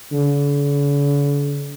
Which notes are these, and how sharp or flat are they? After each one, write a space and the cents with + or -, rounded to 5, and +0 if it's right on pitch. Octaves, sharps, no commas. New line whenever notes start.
D3 -45